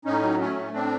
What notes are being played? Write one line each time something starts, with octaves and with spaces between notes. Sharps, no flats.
A2 C#4 D#4
F#3
A3 C#4
A2
A2 C4 D4